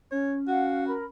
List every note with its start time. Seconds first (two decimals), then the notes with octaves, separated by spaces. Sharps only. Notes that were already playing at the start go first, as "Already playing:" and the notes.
0.11 C#4 C#5
0.48 F#4 F5 F#5
0.87 A#4 B5